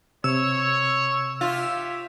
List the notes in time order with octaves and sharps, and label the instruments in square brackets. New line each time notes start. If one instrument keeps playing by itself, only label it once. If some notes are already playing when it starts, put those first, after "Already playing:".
[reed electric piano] C3 [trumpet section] C#5 [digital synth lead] E6
[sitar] F4 [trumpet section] G4 C#5 E5